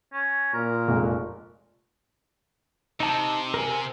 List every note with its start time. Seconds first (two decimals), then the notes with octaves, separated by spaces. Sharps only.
0.13 C#4
0.53 A#2 A#4
0.88 F1 G#3
3.00 C3 D#4 A5
3.54 A#4 G#5